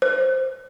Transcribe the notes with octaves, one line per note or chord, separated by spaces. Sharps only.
C5